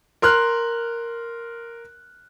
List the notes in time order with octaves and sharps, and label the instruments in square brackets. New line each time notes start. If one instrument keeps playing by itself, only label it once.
[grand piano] A#4 C6 F6 F#6